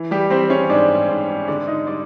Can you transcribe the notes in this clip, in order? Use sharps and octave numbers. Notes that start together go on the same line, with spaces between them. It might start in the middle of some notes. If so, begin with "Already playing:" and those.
Already playing: E3
G3 G4
G3 C4 C5
C#4 C#5
G#2 D4 D5
G#2
D3 D4 D5
D#4 D#5
G3 D4 D5